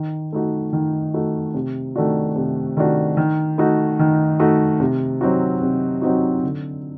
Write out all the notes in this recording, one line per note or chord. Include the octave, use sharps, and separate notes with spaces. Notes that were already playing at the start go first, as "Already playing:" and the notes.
Already playing: D#3
A3 D#4 F#4
D#3
A3 D#4 F#4
C3
D#3 A3 D4 F#4
C3
D#3 A3 D4 F#4
D#3
A3 D#4 F#4
D#3
A3 D#4 F#4
C3
F#3 C4 D#4 F#4
C3
F#3 C4 D#4 F#4
D3